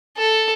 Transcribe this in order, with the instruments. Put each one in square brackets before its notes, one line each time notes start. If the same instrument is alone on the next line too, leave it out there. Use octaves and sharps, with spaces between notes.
[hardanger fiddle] A4